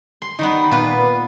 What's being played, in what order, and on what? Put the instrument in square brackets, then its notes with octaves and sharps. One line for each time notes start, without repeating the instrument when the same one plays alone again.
[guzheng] C6
[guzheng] D#3 G3 B3 [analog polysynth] D#4
[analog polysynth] A#2 B3 [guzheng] F4 B4